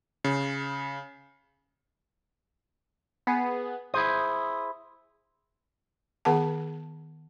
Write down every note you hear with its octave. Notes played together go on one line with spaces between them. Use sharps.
C#3
B3 G#4
E4 G#4 C5 D#6
D#3 B3 G#4 F#5 A5